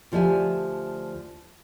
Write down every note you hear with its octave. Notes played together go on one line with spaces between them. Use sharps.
D2 F3 G4 D5 E5 G#5